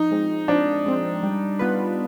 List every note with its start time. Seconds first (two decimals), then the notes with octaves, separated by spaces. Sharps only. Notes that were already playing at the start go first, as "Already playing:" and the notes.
Already playing: F3 D#4
0.11 G#3 C4
0.48 F3 D4
0.86 G#3 C4
1.23 G3
1.59 B3 F4 B4